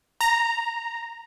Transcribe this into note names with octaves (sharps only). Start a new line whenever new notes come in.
A#5